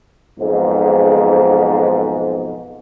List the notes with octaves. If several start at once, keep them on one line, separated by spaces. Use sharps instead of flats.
B1 F2 G#2